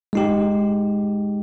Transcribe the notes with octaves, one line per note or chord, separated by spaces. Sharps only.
G#3 D#4 G4